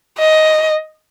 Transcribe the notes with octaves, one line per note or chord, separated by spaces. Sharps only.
D#5